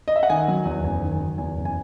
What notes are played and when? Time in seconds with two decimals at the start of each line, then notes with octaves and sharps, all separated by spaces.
0.08 D#5
0.16 E5
0.23 F#5
0.30 D#3 G#5
0.48 F#3
0.66 E2
0.84 F#1 G#5
1.02 D#3
1.11 G#5
1.20 F#3
1.38 E2 G#5
1.57 F#1
1.65 G#5